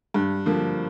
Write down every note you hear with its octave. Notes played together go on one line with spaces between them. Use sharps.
G2
D3 F3 A#3